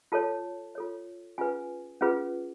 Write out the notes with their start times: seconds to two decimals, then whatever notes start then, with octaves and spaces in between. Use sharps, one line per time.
0.12 F4 A4 C#5 A5
0.75 F4 A4 C#5
1.38 C#4 F4 G#4 B4 G#5
2.01 C#4 F4 G#4 B4